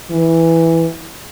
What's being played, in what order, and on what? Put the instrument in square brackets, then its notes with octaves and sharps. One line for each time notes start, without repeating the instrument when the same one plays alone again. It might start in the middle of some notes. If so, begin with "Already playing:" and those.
[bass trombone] E3